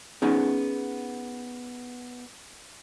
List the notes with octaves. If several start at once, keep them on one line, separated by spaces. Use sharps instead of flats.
B3 C#4 D#4 G#4